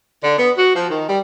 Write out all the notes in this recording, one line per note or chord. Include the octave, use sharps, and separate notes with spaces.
D3
B3
F#4
F3
D#3
G3